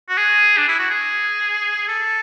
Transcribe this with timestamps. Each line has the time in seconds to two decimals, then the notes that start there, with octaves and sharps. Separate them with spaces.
0.09 F#4
0.18 G#4
0.57 D4
0.68 E4
0.79 F#4
0.91 G#4
1.88 A4